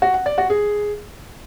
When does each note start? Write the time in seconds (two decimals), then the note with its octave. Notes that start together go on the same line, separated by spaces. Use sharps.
0.02 F#4
0.14 F#5
0.26 D5
0.38 F#4
0.50 G#4